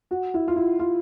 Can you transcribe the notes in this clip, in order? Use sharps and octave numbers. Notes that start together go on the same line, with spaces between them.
F#4
E4
F4
E4
F4